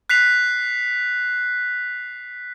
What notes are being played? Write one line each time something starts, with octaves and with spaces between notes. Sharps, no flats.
F#6 B6 C7 F7